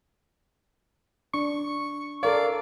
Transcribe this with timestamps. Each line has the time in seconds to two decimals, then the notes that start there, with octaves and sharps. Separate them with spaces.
1.34 D4 C#6
2.23 A4 A#4 D5 F5